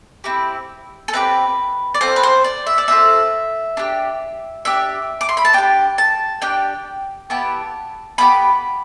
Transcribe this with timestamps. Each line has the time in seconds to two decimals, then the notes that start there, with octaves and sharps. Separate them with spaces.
0.24 C4 E4 G4
1.08 A4
1.13 C4 E4 G4 B4
1.94 D5
2.01 C4 F4 A4 C5
2.16 B4
2.23 C5
2.44 D5
2.67 E5
2.78 D5
2.88 C4 F4 A4 E5
3.77 D4 G4
4.65 D4 G4 E5
5.21 D6
5.29 C6
5.37 B5
5.45 A5
5.53 D4 G4 G5
5.98 A5
6.42 D4 G4 G5
7.30 B3 E4 G4 A5
8.18 B3 E4 G4 B5